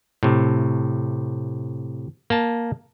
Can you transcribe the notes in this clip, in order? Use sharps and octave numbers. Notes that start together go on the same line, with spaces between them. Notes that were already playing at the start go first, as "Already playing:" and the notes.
A2 C3
A#3 A5